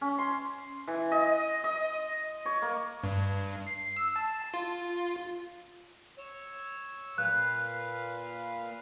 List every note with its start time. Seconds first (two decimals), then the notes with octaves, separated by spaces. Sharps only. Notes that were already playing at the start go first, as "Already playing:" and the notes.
0.01 C#4
0.18 C6
0.87 E3
1.12 D#5
1.64 D#5
2.46 C#5
2.62 A#3
3.04 G2
3.67 C7
3.97 E6
4.16 A5
4.54 F4
6.18 C#5 E6
7.18 A#2 B4 F5 F#6